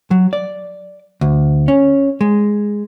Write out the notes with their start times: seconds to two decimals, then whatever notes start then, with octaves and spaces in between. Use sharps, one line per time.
0.11 F#3
0.33 D5
1.21 D2
1.68 C#4
2.21 G#3